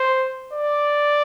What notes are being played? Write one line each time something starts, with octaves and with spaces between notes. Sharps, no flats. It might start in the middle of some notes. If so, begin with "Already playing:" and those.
Already playing: C5
D5